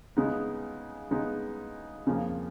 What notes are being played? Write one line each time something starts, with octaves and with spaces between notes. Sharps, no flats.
C#3 G#3 B3 D#4
C#3 G#3 B3 D#4
F2 C#3 F3 A#3